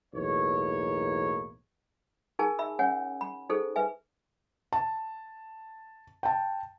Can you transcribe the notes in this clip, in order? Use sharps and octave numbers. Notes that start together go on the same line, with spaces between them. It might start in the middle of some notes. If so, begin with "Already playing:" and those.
B1 E2 A2 A#3 C#5
D#4 G#4 A#4 G#5 A5
E5 B5 E6
C#4 C#5 F#5 G#5
B5
D#4 G#4 A4 C5
B4 E5 G#5
A5
G5 A5